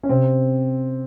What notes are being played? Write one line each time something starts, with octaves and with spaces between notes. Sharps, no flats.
C#4
C3 C4